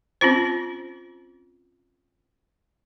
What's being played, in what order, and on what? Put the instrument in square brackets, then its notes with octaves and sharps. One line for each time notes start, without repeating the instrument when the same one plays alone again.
[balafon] C4 C#4 F4 C5